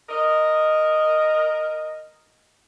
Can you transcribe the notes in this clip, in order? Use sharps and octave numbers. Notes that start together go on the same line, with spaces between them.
A#4 D#5